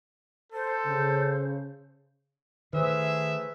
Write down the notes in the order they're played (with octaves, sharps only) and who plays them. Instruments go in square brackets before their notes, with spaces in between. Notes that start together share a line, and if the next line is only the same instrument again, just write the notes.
[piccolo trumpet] A4 [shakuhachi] C5
[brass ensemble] C#3
[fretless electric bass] D#3 [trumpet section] A3 G#4 E5 [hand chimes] B4 C5